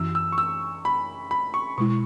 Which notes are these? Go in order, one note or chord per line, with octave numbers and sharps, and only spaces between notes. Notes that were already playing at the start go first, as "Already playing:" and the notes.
Already playing: F#2 E3 C#4 E4 E6
E6
C#6
E6
B5
B5
C#6
B2 G#3 E4 C#6